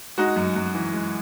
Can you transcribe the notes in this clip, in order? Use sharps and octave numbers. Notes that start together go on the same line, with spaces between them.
G#3 D#4 F#4
F#2
F#2
E3
G#3